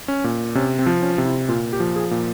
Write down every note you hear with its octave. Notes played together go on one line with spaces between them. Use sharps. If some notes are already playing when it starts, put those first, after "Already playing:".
C#4
A#2
C3 C#4
C4
F3
C#4
C3
E4
A#2 F4
G4
F3
G#4
A#2